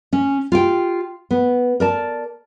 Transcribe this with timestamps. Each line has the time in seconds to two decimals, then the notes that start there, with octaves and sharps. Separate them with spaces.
0.13 C#4
0.52 F4 G4 G5
1.31 B3
1.80 A#4 D5 A5